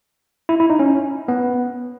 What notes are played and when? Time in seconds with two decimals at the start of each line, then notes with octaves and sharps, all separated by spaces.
0.49 E4
0.60 E4
0.70 D#4
0.79 C#4
1.28 B3